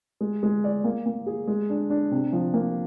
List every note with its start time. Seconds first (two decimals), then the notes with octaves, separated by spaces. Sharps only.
0.21 G#3
0.43 G#3
0.64 D5
0.84 A#3
1.06 A#3
1.26 G#4
1.47 G#3
1.70 D4
1.90 D4
2.11 C3
2.33 F3
2.54 A#3